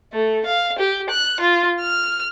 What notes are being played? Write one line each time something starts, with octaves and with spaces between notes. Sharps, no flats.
A3
F5
G4
F#6
F4
F6